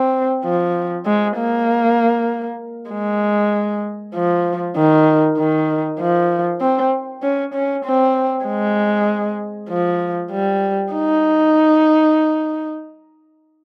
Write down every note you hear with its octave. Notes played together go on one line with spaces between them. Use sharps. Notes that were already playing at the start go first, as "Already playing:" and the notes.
Already playing: C4
F3
G#3
A#3
G#3
F3
D#3
D#3
F3
C4
C#4
C#4
C4
G#3
F3
G3
D#4